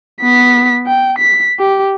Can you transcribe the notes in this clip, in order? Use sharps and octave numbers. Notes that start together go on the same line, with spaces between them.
B3 B6
G5
B6
G4